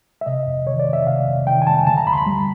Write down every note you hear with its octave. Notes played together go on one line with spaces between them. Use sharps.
E5
C3 D#5
F2
D#3 C#5
D5
F2
E5
C3 F5
F2
D#3 G5
G#5
F2 A5
D3 A5
A#5
D2 B5
C6
B5
G3